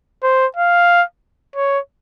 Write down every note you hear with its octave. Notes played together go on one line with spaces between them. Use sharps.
C5
F5
C#5